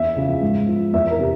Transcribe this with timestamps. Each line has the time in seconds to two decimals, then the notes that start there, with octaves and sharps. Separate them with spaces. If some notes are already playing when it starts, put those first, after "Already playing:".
Already playing: E2 E5
0.17 C#3 F3
0.41 G#2
0.68 F3
0.93 E2 E5
1.10 A#4
1.19 C3